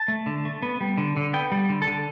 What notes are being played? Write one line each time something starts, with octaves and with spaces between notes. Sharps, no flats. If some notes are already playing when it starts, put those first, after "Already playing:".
Already playing: A5
A3
D3
A3
B3
G3
D3
D3
B3 G5
G3
D3
A4
D3